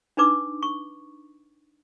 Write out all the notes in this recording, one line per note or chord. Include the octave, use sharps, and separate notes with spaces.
D4 D#4 B4 D6 E6
C#6